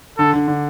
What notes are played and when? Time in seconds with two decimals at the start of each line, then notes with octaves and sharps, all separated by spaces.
0.18 D3 A4
0.34 D3
0.48 D3